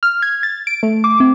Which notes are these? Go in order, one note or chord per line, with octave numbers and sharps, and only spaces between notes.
F6
G#6
A6
D7
A3
D6
C4